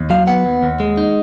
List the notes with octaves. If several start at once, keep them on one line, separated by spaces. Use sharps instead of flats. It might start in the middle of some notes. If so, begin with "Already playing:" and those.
Already playing: D#2
F#3 F5
B3 F#5
D#2
D#2
G#3
D#4